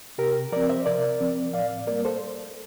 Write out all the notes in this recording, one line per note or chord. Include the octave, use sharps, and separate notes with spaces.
C3 G4 A#4
F3 C4 A#4 D5
C5 E5
C3 A#4 D5
F3 C4
A2 D5 F5
G3 A#3 A#4 D5
A4 C5